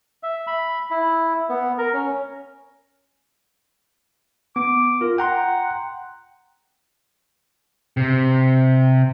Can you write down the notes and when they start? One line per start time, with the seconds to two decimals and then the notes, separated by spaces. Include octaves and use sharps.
0.23 E5
0.47 B5
0.91 E4
1.49 B3
1.78 A#4
1.93 C#4
4.56 B3 D6
5.01 F4 A#4
5.18 F#5 G5 A#5 C6
7.97 C3